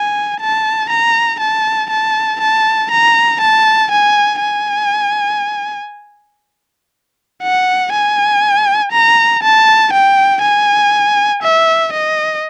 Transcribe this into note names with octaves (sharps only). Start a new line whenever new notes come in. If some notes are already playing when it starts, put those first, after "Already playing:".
Already playing: G#5
A5
A#5
A5
A5
A5
A#5
A5
G#5
G#5
F#5
G#5
A#5
A5
G5
G#5
E5
D#5